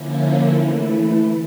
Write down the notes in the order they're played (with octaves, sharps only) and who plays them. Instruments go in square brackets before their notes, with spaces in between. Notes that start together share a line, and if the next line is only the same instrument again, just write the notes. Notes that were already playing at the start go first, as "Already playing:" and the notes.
Already playing: [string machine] D3 F3 A#3 C#4 E4
E3 A3 E4